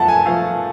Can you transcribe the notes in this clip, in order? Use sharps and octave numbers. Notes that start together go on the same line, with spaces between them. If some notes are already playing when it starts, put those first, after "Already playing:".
Already playing: F#2 F3 A3 F#5 A5
G#5
F3 A3 F5